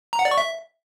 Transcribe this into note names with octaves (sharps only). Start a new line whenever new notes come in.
A#5
F#5
D5
C#6
E5